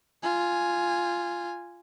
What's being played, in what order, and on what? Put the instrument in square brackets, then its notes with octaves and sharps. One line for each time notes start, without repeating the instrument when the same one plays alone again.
[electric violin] F4 G#5